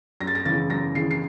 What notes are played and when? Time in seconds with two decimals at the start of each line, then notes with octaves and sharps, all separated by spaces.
0.21 F#2 A#6
0.27 A6
0.35 A#6
0.45 C#3 E3 A6
0.70 F#2 A#6
0.95 C#3 E3 C7
1.11 C7